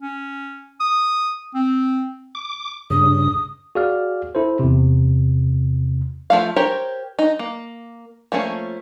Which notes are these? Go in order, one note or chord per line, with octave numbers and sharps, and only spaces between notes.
C#4
D#6
C4
D6
G2 C#3 D#6
F#4 G#4 D5 F5 F6
E4 A4 C5
E2 C3
F3 A3 F5
G4 A#4 C5 C#5
D#4
A#3
F3 A3 A#3 C#4